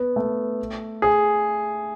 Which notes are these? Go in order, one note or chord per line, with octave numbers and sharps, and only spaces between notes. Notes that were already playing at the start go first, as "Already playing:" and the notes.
Already playing: B3
A3
G#4